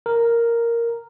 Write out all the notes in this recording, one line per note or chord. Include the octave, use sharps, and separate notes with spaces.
A#4